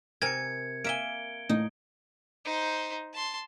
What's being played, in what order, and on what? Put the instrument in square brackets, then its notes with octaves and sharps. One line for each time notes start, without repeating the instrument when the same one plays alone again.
[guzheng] C3 A#4 G#5 [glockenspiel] G#6 C#7
[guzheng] A#3 E5 G#5 [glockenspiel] D7 G7
[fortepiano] A2 [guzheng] D#4
[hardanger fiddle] D#4 C5
A5 C6